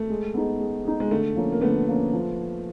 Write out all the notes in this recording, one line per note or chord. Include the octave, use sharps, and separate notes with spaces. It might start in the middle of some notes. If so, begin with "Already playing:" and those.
Already playing: A3
G#3
B3 D#4 G#4
G#3
B3 D#4 G#4
G#3
D3 A3
F3 A#3 C#4
A#3
D3 A3 B3
F3 A#3 C#4
F3